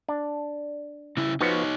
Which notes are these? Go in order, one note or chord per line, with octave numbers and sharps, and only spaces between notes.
D4
C#3 E4
F3 B3 D#4 F#4 C#5